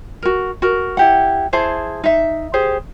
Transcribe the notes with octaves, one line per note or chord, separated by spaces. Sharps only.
F#4 A#4
F#4 A#4
E4 G4 F#5
E4 G#4 C5 A5
D#4 E5
G4 G#4 C5